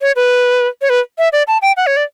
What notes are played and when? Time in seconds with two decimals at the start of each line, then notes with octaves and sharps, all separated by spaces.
0.01 C#5
0.16 B4
0.82 C#5
0.90 B4
1.18 E5
1.33 D5
1.48 A5
1.62 G5
1.77 F#5
1.87 C#5
1.97 D5